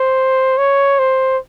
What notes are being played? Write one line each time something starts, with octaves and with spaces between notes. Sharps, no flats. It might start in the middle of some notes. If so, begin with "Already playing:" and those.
Already playing: C5
C#5
C5